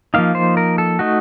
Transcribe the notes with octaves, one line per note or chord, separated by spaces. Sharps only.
F3 A#3 D#4 F5
C5
A#4
A4
A3 D#4 F#4